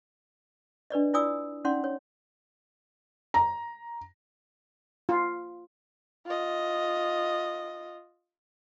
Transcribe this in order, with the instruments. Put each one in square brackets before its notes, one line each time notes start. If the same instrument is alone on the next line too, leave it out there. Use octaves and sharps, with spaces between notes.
[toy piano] D4 B4 D5 D#5
E4 F4 D5 G#5 D#6 E6
C#4 D#4 D5 F#5 C6
C#5
[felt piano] A#5
[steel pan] F4
[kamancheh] F4 D#5